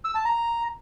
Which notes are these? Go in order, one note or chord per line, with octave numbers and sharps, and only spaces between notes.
E6
A5
A#5